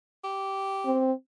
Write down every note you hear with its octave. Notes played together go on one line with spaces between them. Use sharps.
G4
C4